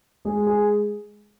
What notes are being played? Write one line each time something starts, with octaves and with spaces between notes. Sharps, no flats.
G#3 G#4
G#4